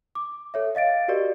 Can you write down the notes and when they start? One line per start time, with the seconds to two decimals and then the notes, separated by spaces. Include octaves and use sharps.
0.15 D6
0.54 A4 C#5 E5
0.75 D#5 F5 A6 D7
1.08 F#4 G4 A#4 D5 D#5